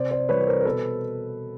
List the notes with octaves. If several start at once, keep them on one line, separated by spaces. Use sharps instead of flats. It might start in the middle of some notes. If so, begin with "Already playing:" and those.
Already playing: C3 C5 D5
C5 D5
E3 G3 B4 C#5
B4
A#4 C5
A#4
B2 A4 B4